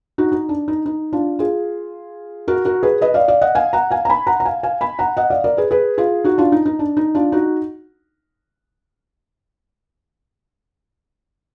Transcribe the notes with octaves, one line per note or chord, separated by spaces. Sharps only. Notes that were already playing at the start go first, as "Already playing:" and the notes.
D#4 F#4
D#4
D4
D#4
D#4
D4 F4
F4 G#4
F#4 A#4
F#4 A#4
G#4 B4
B4 D#5
D5 F5
D5 F5
D#5 F#5
F5 G#5
F#5 A#5
F5 G#5
A#5
G#5 B5
F#5 A#5
A#5
F5 G#5
F5 G#5
G#5 B5
F#5 A#5
D#5 F#5
D5 F5
A#4 D5
G#4 B4
G#4 B4
F4 G#4
D#4 F#4
D4 F4
D#4
D#4
D4
D#4
D4 F4
D#4 F#4